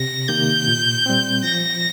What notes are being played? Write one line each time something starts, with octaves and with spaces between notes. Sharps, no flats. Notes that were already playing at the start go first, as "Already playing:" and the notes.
Already playing: C3 A#6
D#3 A#3 G4 G6
A#2
G3 C4
F3 A#6